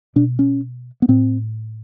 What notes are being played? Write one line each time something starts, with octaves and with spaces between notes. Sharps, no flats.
B2 D4
C#4
B3
A2 C4